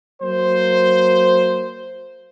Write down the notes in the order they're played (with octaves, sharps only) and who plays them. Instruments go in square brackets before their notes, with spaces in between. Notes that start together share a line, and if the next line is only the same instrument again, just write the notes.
[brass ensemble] F#3 A#3 C5